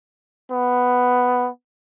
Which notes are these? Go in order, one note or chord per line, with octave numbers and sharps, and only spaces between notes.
B3